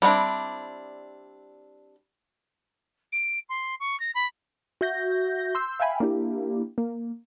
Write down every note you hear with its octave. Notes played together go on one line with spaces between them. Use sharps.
G3 B3 C4 D4 E4
D7
C6
C#6
A#6
B5
F#4 E5 G6 A#6
C6 E6 G6
E5 F5 G5 G#5 B5
A#3 D4 E4 G4
A#3